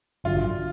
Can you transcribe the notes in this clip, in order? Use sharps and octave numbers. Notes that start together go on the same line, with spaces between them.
A1 G2 D3 F#3 F4